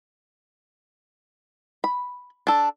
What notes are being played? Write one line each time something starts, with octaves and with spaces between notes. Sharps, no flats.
B5
D4 A4